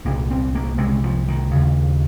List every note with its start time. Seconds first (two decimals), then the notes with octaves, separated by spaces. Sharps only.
0.05 C2 A#2 A#3
0.30 C4
0.55 A#3
0.78 C2 C3 G#3
1.04 F3
1.28 D#3
1.51 D#2 C#3